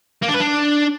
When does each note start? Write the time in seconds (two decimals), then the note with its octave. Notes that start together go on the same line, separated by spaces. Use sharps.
0.22 A#3
0.28 D4
0.34 B4
0.40 D4